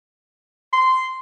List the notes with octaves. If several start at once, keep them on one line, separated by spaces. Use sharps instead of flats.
C6